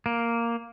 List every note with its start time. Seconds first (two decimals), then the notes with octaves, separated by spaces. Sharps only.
0.06 A#3